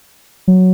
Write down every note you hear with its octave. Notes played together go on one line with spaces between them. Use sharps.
F#3